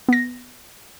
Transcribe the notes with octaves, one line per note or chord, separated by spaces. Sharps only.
B3 A#6